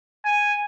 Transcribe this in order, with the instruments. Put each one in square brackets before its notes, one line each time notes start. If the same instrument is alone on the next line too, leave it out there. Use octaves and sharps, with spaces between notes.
[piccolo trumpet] G#5